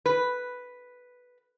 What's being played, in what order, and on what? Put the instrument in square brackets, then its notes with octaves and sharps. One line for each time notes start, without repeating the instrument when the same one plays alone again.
[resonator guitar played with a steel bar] B4